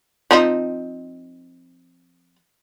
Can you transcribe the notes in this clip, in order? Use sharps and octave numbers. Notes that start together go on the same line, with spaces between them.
F3 C4 D#4